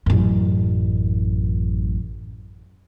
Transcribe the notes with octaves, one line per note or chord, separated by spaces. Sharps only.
A1 F#2